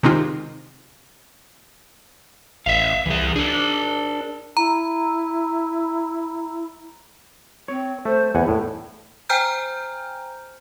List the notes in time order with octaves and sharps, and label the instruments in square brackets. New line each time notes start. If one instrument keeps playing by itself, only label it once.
[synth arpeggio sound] C3 D#3 G#3 C4 D#4 F4
[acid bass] A1 [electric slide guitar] E5 F5
[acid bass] C2 [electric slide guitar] E3 G#4
[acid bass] D4 [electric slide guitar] G#4 A#4
[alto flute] E4 [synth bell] A#5
[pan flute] C4 [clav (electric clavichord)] C#5
[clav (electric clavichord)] A3 [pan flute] C5
[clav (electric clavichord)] E2 F#5 G#5 [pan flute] E4
[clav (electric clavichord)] A2
[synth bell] C5 G5 G#5 A#5 F6 G6